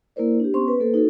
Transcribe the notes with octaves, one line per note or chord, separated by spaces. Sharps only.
A#3 E4 A#4 C5 D5
D4 G4
B3 C#4 C5 C6 C#6
B4
A#3 A4 B4 C5
D#4 F#4 A4